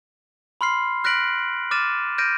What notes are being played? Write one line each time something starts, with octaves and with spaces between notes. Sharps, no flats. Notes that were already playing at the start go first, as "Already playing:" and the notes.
B5 C6 F6 C7
F6 F#6 A#6 B6 D7 F#7
D6 F6 A6 D#7 E7
F6 G6 A#6 D7 D#7